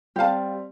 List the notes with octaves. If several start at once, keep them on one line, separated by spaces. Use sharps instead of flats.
G3 C4 G4 F5 A5